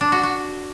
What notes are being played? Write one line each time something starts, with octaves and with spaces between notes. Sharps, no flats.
D4
F#4
F#4